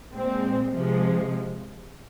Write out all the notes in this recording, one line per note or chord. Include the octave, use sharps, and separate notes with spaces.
A#2 G#3 C4
C3 F3 G#3